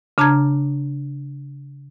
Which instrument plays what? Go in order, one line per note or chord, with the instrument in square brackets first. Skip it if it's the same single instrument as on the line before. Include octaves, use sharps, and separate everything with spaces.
[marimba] C#3 D4 A5 A#5 F6 G#6